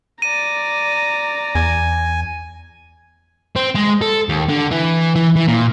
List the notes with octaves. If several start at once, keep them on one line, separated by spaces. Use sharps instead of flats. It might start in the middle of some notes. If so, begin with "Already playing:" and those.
D5 A#5 D#7
E2 G#5
C4
G#3
A4
D#2
D3
E3
E3
E3
A#2